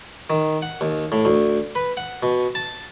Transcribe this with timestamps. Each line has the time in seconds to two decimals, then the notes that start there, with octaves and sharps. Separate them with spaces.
0.30 D#3
0.62 F#5
0.81 D#2
1.12 A2
1.25 D2
1.75 B4
1.97 F#5
2.23 B2
2.55 A5